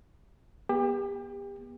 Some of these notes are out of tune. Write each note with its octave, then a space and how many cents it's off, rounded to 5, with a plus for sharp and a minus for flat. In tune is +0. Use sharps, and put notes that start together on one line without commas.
B3 -30 G4 +30